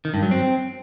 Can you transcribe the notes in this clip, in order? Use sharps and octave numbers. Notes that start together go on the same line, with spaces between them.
D#3
G2
F#3
C4